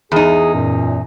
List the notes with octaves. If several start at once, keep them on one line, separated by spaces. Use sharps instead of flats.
E2 D#4 G#4
F#2 A#2